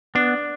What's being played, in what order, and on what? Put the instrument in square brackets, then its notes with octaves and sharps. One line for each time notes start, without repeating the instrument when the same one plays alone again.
[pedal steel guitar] B3 [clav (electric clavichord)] D4